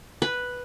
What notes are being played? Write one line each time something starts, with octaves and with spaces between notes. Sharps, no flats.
B4